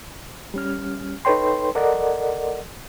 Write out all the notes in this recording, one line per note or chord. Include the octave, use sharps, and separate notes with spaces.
G3 C#4 F6
D#4 A4 B4 C#5 G5 C6
A4 A#4 D5 D#5 F#5